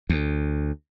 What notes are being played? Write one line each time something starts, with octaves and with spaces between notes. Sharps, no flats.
D2